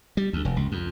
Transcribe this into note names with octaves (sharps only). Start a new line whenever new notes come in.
G3
D2
F1
C#2
F2